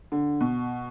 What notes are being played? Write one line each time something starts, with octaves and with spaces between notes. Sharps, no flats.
D3
B2